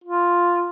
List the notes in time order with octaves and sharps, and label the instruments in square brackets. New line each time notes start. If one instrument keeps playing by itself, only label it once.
[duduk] F4